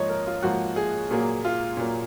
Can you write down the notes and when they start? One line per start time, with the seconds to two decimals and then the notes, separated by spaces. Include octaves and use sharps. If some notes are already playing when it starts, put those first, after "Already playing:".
Already playing: G#2 F3 A#3 C#5 D#5
0.09 A#4
0.27 F4
0.42 G#2 F3 A#3 F#4
0.76 G#4
1.11 A#2 F#3 A#3 G#4
1.45 F4
1.77 A#2 F#3 A#3